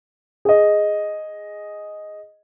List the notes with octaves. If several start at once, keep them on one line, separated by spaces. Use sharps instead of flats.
G#4 D#5